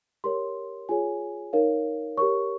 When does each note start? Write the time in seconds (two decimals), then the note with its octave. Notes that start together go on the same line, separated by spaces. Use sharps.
0.24 G4 A#4 C#5 C6
0.89 F4 G#4 C#5 G#5
1.53 D#4 A#4 C#5 F5
2.18 G4 A#4 C#5 C#6